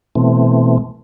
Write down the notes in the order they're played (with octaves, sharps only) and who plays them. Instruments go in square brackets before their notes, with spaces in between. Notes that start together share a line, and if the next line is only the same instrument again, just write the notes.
[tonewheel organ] B2 E3 A3 C4